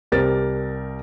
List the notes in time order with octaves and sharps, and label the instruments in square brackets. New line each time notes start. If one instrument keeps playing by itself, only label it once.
[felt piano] C2 G4 A#4 C5 A6